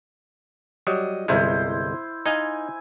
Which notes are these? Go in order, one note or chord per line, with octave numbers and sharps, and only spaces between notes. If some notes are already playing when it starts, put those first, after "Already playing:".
F#3 G3 D#5
G1 C2 G#3 E4 C5 C6
D#4 D#5 F5 G#5